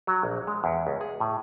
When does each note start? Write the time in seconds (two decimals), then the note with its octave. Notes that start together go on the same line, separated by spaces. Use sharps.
0.07 F#3
0.23 A#1
0.47 G#3
0.64 E2
0.87 C#2
1.01 G#4
1.20 A2